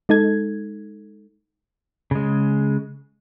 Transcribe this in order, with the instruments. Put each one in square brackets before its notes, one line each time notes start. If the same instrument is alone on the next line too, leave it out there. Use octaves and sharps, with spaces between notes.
[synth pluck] G#3 D#4 A4 G#6
[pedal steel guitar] C#3 G#3